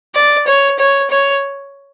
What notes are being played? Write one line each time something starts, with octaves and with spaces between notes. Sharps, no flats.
D5
C#5
C#5
C#5